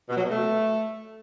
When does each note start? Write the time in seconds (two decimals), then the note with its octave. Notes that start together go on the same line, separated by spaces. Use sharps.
0.09 B2
0.16 F#3
0.23 B2
0.30 A3